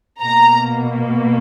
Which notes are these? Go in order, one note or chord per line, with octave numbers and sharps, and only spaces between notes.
B2 A#3 A#5